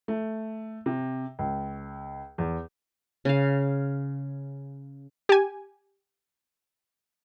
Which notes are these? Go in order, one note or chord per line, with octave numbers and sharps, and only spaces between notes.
A3
C3
C#2
E2
C#3 F5
G4 G#5